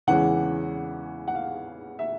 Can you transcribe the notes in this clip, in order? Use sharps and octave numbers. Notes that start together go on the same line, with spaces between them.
E2 C#3 E3 G#3 C#4 F#5
F#5
F5
E5